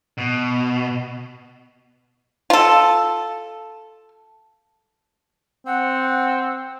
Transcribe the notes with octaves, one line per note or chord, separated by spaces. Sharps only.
B2
F4 A4
C4 F#5